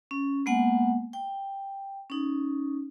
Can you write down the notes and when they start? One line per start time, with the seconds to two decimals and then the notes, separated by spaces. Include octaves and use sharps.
0.11 C#4
0.46 G#3 A#3 B3 F#5 G#5
1.13 G5
2.10 C#4 D#4